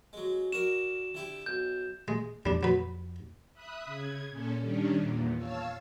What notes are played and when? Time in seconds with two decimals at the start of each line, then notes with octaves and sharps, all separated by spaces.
0.13 F#3 G#3
0.52 F#4 A#4 D5 E7
1.15 D3 E4 G4
1.46 B1 G6
2.08 G#3
2.46 F2 G3 D4
2.63 F#3 B4
3.54 E5 B5 D#6 F#6
3.85 C#3 G#6
4.30 A#2 C#4 A4
4.59 D#3 G3 C#4 D4
4.99 E2 A#2
5.36 C#5 F5 A5 E6